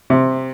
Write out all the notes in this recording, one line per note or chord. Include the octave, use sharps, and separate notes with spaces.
C3